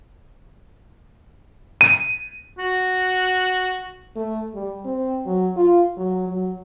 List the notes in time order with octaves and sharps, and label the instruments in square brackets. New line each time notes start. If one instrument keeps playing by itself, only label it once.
[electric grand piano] D#7
[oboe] F#4
[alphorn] A3
G3
C4
F#3
F4
F#3
F#3